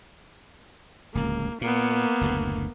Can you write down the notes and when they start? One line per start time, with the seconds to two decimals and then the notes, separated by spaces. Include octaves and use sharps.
1.15 D1 C#2 A#3
1.61 A#2 A#3 B3
2.21 F#1 D2 A2